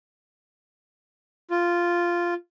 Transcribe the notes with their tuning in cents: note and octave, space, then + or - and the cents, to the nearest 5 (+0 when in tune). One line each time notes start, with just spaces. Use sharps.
F4 -5